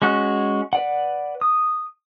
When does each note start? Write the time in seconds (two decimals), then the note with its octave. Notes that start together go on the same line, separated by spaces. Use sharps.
0.02 G#3 C#4 F#4 F#6
0.73 B4 D5 F#5
1.41 D#6